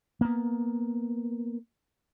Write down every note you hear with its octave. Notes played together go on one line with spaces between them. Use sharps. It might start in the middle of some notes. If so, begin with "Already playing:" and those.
A#3 B3